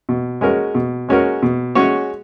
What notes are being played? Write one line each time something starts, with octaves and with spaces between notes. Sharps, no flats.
B2
G#3 C#4 F#4 A#4
B2
G#3 C#4 F#4 A#4
B2
G#3 C#4 F#4 C#5